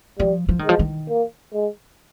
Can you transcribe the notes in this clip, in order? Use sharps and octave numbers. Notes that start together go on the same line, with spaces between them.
F3 G3
F3
D#3
F3 G#3
D#3
A#3
G#3